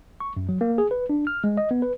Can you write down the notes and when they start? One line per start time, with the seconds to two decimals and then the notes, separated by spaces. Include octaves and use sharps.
0.20 C#6
0.37 F#2
0.49 F#3
0.61 A#3
0.78 G#4
0.91 B4
1.10 D4
1.27 F6
1.44 G#3
1.57 D#5
1.71 B3
1.82 B4